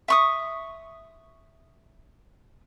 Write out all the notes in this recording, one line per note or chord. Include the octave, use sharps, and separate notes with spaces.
E5 C#6 D#6